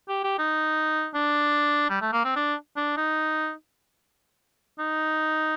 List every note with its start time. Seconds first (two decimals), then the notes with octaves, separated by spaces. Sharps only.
0.09 G4
0.24 G4
0.39 D#4
1.15 D4
1.90 G3
2.02 A3
2.13 A#3
2.25 C4
2.36 D4
2.77 D4
2.97 D#4
4.79 D#4